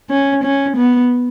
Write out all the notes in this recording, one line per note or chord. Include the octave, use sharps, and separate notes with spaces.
C#4
C#4
B3